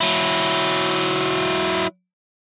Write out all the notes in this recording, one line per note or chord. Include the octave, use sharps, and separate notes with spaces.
F#3 E4